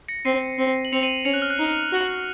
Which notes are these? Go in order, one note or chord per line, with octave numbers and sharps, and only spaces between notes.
A#6 C#7
C4 C7 D#7
C4
F#7
C4 C#7 F7
D#7 F#7
C#4 C#7 F7
F#6
F6
F#6
D#4
F#4